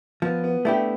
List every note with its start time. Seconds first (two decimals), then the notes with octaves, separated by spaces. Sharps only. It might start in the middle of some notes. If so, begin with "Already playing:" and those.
0.22 F3 B3
0.44 B3
0.65 A3 D4 E4 G4